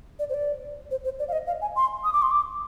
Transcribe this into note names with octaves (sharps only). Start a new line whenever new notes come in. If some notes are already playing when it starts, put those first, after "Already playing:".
D5
C5
D5
C5
C5
D5
F5
D#5
F5
G#5
C6
D#6
D6
C6
D6